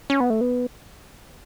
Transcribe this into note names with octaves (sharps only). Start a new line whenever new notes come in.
C#4
B3
A3
B3